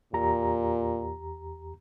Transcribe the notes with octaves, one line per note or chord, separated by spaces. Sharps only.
E2 A#2 G4 A#5